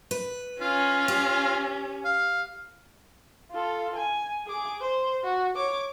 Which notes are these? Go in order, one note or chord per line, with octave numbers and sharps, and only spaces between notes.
B4
C#4 F4
G4
F5
F4 A4
G#5
G#4 D6
C5
F#4
C#5 D6